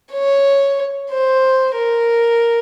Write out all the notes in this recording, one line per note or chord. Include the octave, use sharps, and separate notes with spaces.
C#5
C5
A#4